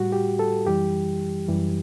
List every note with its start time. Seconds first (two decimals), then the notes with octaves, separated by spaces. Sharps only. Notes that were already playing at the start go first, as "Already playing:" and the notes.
Already playing: A2 G3 F#4
0.12 G4
0.39 A4
0.66 F#2 E3 G3 G4
1.48 F#2 E3 G3